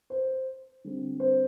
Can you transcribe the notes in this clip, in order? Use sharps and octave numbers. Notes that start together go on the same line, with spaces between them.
C5
D3 G3 C4
C5